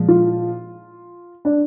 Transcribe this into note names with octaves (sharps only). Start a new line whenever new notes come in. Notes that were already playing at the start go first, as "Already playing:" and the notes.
Already playing: A#2 F3 G#3
F4
D4